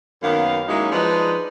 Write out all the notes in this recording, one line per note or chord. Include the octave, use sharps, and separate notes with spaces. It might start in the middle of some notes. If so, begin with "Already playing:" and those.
F#2 D#3 A#3 B3 F5
F#3 G#3 A#3 C#4 D#4 E4
F3 G#3 D4 D#4 G#4 B4